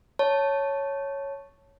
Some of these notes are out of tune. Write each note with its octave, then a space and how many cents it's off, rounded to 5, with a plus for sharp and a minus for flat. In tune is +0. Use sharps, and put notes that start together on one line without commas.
C#5 +0 A5 +0